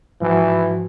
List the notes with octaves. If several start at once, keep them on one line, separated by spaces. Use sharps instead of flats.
G#2 E3 F3 F#4